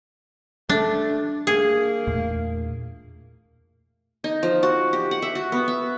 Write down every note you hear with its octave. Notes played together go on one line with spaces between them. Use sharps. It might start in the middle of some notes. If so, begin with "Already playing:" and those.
G3 A3 D4
A#3 G#4
E2 A#2 A3
D#4
F3
F#4
G4
F#5
E5
F#4
B3
E5